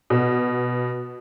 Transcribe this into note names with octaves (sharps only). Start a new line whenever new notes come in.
B2